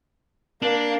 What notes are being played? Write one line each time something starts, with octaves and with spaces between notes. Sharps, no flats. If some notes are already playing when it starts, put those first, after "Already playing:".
A#3 D4